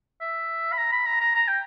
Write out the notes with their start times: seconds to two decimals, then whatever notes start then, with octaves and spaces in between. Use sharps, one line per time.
0.21 E5
0.72 B5
0.77 A#5
0.92 B5
1.06 A#5
1.21 A#5
1.35 A#5
1.48 G5